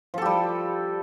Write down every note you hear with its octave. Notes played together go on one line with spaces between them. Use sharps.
F3 G3 G4 A4